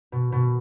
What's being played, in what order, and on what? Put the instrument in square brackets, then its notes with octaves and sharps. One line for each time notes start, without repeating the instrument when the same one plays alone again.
[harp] B2
B2